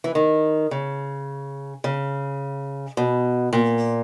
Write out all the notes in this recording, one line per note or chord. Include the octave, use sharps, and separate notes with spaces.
E3
D#3
C#3
C#3
B2
A#2